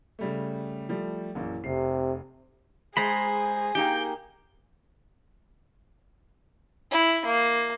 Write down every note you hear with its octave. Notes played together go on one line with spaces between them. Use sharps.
C#3 G3 A3
F3 G3 A3
A#1 F#2 E3
F1 C3 C7
G#3 G#4 C5 A#5 B5
A#3 D#4 G4 G5
E4
A#3